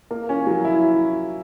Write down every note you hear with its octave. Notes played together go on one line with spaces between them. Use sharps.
A#3
C#4
F#3
E4